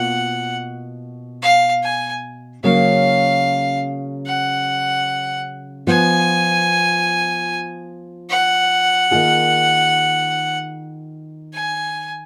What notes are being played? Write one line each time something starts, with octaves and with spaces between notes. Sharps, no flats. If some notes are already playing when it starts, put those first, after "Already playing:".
Already playing: B2 A#3 F4 F#5
F5
G#5
C#3 F#3 A#3 C#4 F5
F#5
F3 B3 F4 G#5
F#5
D#3 A#3 F4 G#4
G#5